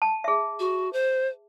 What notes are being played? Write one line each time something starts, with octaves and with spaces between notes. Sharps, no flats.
A5
G#4 E5
F#4
C5